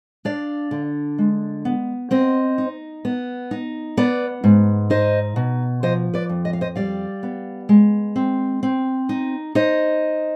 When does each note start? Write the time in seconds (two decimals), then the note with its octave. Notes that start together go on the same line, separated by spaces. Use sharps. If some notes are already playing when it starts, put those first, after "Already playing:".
0.25 D4 D5 F5
0.71 D3
1.19 G#3
1.65 B3
2.11 C4 C5 D#5
2.58 D#4
3.05 B3
3.51 D#4
3.97 B3 B4 D5
4.44 G#2
4.90 D#4 C5 D#5
5.36 B2
5.83 F3 C5 D#5
6.14 B4 D5
6.29 F2
6.45 D#5
6.53 F5
6.61 C5 D#5
6.76 G3 D5 F5
7.23 B3
7.69 G#3
8.16 C4
8.63 C4
9.09 D#4
9.55 D#4 C5 D#5